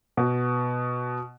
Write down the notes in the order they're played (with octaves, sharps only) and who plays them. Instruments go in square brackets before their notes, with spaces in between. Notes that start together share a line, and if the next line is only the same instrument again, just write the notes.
[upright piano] B2 B3